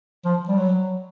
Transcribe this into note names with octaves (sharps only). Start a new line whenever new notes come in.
F3
G3
F#3